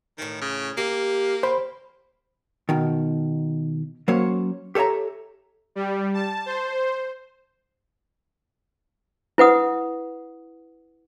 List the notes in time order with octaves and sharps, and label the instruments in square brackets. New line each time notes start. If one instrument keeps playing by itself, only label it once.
[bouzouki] A2 E3 [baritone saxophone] D#3
[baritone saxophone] C#3
[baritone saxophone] A#3 [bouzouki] G4
[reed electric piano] C5 B5 [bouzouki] G5
[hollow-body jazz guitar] B2 D#3
F#3 A#3 C#4 C5 C#5
G4 A4 C#5 E5 A#5
[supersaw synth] G3
A5
C5
[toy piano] E4 B4 F#5 D#6